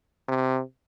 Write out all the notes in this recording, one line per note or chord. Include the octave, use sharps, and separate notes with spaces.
C3